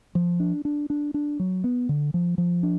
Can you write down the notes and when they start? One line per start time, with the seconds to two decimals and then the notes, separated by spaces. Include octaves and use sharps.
0.15 F3
0.40 D4
0.65 D4
0.90 D4
1.14 D4
1.39 F#3
1.64 B3
1.89 D3
2.14 F3
2.38 F3
2.63 D4